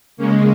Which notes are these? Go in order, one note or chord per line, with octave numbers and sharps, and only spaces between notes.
C#3 G#3 A#3 C#4